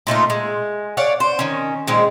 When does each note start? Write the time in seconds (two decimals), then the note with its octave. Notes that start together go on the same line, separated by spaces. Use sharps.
0.07 A#2 A3 D#4 F4
0.30 G#3
0.97 C#5 D5 F5 F#5
1.20 C5
1.39 D#3 C#4
1.87 A#2 D#3 G#3 C4